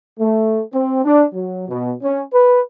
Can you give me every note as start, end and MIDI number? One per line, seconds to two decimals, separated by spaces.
0.19 0.62 57
0.73 1.04 60
1.05 1.24 62
1.34 1.64 54
1.68 1.92 47
2.03 2.21 61
2.33 2.60 71